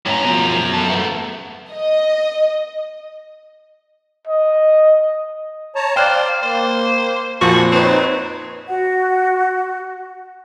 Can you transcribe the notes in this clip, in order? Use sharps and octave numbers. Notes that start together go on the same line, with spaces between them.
F#2 A2 C#4 A#5
B2 F3
E2 A4
A3 B3
D#5
D#5
C#5 A5 A#5
C5 D5 F5 G5 F6 F#6
A#3 C5
F2 A#2 F3 F#4 A5 C#6
C4 D#4 B4 C#5
F#4 F#5